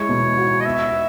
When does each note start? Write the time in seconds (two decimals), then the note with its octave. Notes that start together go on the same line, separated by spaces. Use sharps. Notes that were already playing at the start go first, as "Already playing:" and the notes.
Already playing: G#3 E4 C#5
0.09 B2
0.37 F#4
0.60 D#5
0.65 B3 E5